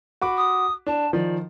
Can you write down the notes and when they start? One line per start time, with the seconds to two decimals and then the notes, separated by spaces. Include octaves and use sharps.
0.21 F#4 B5 D6
0.37 D#6
0.87 D4 A5
1.13 D#3 F3 D5